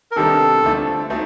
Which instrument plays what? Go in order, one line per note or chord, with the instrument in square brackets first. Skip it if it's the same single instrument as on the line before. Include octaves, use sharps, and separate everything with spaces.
[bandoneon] A#4
[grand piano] C3 D#3 G3 B3 D4 [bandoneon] A4
[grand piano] D3 F3 A3 D4
F#3 A3 C4 D#4